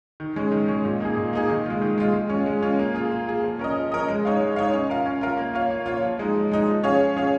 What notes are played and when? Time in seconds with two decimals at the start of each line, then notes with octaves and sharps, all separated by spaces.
0.20 D#3
0.36 G#3 C#4
0.52 D#3
0.68 G#3 C#4
0.84 A#2
1.00 A#3 D#4 G#4
1.16 A#2
1.33 A#3 D#4 G#4
1.50 D#3
1.65 G#3 F4
1.81 D#3
1.98 G#3 F4
2.14 G#3
2.30 C#4
2.35 F4
2.46 G#3
2.63 C#4 F4
2.79 A#3
2.95 F4 G#4
3.12 A#3
3.27 F4 G#4
3.44 F3
3.59 C#4 A#4 D#5
3.76 F3
3.92 C#4 A#4 D#5
4.08 G#3
4.25 D#4 C#5 F5
4.40 G#3
4.56 D#4 C#5 F5
4.73 C#4
4.90 F4 A#4 F5
5.06 C#4
5.21 F4 A#4 F5
5.37 A#3
5.54 F4 C#5 F5
5.70 A#3
5.86 F4 C#5 F5
6.03 F3
6.19 G#3 D#4
6.34 F3
6.52 G#3 D#4
6.68 F3
6.83 C#4 G#4 C#5 F5
6.99 F3
7.17 C#4 G#4 C#5 F5